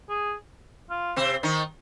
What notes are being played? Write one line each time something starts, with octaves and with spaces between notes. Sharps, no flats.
G#4
F4
C3 C4
D#3 D#4